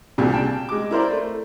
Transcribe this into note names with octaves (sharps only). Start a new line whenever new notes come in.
C2 A#2 C#3 D4 G4
G5 A5
G#3 D6
E4 A#4 C5 D5
A3